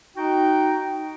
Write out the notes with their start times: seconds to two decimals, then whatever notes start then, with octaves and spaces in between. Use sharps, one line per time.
0.16 D#4 F#4 G5